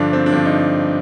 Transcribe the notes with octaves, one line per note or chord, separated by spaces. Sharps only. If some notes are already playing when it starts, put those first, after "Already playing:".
Already playing: G2 D3 F3 D4
C4
D4
G2 D3 F3 C4
D#4